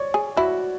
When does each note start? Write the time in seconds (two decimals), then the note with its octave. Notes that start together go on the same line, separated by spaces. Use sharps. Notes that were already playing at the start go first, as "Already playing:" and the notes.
Already playing: C#5 D5
0.14 G#4
0.37 E4 F#4